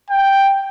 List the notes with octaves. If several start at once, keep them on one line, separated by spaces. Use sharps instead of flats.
G5